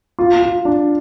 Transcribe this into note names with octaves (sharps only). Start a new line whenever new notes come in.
F4
F4
D4